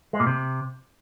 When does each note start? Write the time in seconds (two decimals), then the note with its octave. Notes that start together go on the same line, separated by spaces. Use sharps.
0.13 G#3
0.20 A#2
0.27 C3